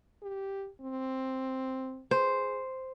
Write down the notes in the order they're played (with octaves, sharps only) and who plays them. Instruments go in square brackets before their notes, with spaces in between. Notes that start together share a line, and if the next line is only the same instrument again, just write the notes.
[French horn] G4
C4
[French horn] G#4 [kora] C5